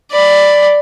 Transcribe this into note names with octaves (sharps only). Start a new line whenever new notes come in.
D5 B5